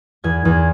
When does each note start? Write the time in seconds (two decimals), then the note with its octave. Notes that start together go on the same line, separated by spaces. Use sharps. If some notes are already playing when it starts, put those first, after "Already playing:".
0.24 E2 G#6
0.45 E2